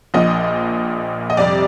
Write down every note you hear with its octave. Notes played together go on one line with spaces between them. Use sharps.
A#1 A#2 F3 D#5
D#5
F2 C3 G3 D5